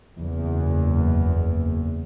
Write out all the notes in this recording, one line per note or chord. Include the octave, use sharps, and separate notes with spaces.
F#1 E2